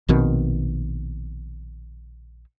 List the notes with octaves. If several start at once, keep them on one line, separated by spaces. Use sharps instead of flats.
A#1 B2 D#3 C4